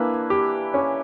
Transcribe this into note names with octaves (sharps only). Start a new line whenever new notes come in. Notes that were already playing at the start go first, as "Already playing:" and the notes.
Already playing: E3 A#3 D4 E4 B4
G4
C#4